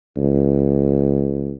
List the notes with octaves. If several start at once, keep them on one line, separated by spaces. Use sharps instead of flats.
C#2